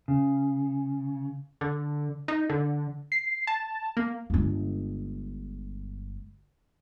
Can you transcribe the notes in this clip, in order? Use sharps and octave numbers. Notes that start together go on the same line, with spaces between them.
C#3
D3
D#4
D3
C7
A5
A#3
G1 G#3